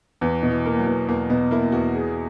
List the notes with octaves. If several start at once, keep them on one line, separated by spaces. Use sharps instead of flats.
E2 E3
B2
E3
A#3
F#3
E2
E2 A#3
B2 B3
A#3 E4
E2 F#4
G#4